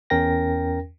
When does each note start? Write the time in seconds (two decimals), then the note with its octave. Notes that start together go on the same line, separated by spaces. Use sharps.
0.10 E2 C#4 A#4 G5 A#6